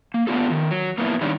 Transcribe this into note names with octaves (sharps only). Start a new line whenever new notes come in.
A#3
A3 B3 D4 F4 G4 A4
D#3 F3
F#3
A#3 B3 E4
D#3 G3 C#4 D4